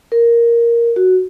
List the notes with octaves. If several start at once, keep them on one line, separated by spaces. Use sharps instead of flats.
A#4
F#4